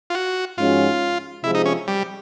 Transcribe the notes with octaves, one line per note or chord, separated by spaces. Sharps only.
F4
F#4
G#2 F3 G#3 C#4 F4 F#4
C3 F3 G#3 E4
D#4
C#4
G3